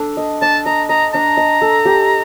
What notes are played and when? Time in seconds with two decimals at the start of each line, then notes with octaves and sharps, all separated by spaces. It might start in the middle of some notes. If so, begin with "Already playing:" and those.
Already playing: D4 A4
0.17 D#5
0.42 D4 A5
0.66 D#5 A#5
0.89 D#5 A#5
1.14 D4 A#5
1.37 D#5
1.62 A4
1.85 G4